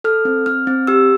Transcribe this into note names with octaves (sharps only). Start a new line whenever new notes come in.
A4 F6
C4
C4 F6
C4
G4 E6